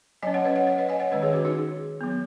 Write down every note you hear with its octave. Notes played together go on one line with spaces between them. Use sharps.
F#3 C#4 D#5 G#5
C#5 F#5
B4 D#5
C#5 F#5
C#5 F#5
B4 D#5
D#5 G#5
C#5 F#5
D#3 G#3 C#4 B4 D#5
G#4 C#5
F#4 B4
D#4 G#4
F#3 B3